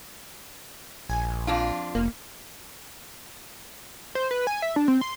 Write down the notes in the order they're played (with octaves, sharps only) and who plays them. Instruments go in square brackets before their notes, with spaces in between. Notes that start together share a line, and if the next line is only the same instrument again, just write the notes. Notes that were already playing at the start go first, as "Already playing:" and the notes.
[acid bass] A#1 [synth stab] G#5
[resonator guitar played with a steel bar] F2 D4 F4
[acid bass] F1 [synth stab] A#3
[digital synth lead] C5
B4
G#5
E5
D4
C4
C6